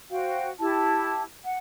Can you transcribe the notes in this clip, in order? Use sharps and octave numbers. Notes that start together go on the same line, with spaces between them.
F#4 C5 F5 G5
E4 G4 A5
F#5